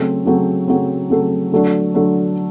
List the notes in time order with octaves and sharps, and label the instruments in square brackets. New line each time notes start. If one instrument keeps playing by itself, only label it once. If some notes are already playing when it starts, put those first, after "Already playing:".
Already playing: [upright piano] C#3 F#3 A3 C4
C#3 F#3 A3 C4
C#3 F#3 A3 C4
C#3 F#3 A3 C4
D3 F#3 A3 D4
D3 F#3 A3 D4